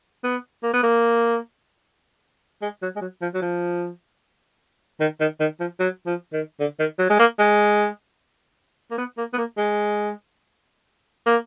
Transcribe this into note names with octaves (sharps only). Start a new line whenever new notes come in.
B3
A#3
B3
A#3
G#3
F#3
G#3
F#3
F3
F#3
F3
D#3
D#3
D#3
F3
F#3
F3
D#3
D3
D#3
F#3
G#3
A#3
G#3
A#3
B3
A#3
B3
A#3
G#3
A#3